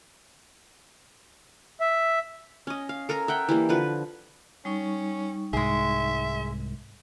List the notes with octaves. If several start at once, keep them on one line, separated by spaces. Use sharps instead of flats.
E5
C#4 D#5
F5
A4 A#4 G#5 A#5
E5 F#5 G5
E3 G3 A#3
D3 F3 B4
G3 C#4 D#4 C#6
C2 G#2 G#3 G#4 E5